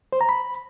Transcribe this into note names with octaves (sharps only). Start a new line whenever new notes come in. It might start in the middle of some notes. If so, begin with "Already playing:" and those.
C5
A#5
B5